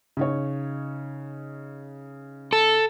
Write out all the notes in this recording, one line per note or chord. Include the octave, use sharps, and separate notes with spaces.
C#3 D#4 C#5
A4